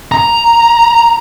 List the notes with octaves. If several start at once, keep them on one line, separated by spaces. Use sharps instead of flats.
A#5